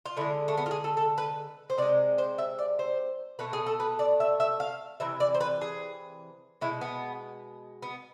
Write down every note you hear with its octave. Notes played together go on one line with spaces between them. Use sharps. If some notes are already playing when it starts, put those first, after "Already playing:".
F4
D3 G#3 E4
A3
B3
F4
G#4
A4
A4
B4
C5
C3 G#3 D5
C5
E5
D5
C5
B2 A3 B4
G#4
A4
B4
D5
E5
E5
F5
C3 E3 E5
D5
C5
B4
G#4
B2 G#3 E4
B3
B3